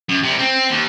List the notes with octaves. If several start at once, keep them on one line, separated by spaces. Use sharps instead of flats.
F#2
C3 G3
C4
D#2